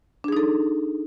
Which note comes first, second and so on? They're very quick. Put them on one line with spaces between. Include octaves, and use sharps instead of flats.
D4 G#4 D#4 A4